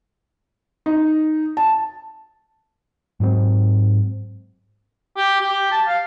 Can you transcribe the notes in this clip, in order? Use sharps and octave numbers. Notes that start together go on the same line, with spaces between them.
D#4
A5
G#2 F#3 G#3 C4
G4
G4
A5
F5